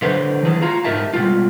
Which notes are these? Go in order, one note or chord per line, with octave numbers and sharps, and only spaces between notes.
D3 F#3 B4 C5
E3 G#4 A5
F4 F#4 A#5
G#2 D#4 G4 A#4 E5 A5
B2 G3 G#3 F4